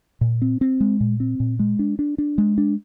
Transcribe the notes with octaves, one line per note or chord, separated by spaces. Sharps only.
A#2
C4
C4
G#3
A#2
C4
A#2
G#3
D4
D4
D4
G#3
D4